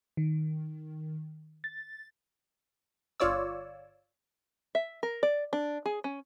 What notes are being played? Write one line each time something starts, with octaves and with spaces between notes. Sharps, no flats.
D#3
A6
G1 F4 C#5 D5 E6
E5
A#4
D5
D4
G#4
C#4